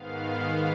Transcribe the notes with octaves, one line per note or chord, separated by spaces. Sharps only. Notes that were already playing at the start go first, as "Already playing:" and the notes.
Already playing: G#2 D#3 B3 F5